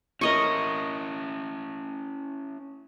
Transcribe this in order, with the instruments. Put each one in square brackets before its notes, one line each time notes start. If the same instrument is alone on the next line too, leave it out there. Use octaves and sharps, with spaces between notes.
[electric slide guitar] C#4 E4 [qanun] A#4 D#5 C#6